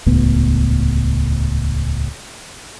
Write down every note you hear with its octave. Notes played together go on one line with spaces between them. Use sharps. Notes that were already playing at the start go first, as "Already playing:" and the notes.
D#1 C#2 A2 B3